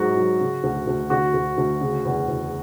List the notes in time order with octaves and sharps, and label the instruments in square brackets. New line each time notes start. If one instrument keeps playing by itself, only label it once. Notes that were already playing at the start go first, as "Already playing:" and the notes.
Already playing: [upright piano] G#2 F#3 F#4
F#3
C#3
D2
D2
D3 F#4
D2
D2
C#3
E2
E2